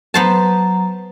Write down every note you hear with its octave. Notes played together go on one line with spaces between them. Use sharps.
F#3 B3 C5 A5 A#5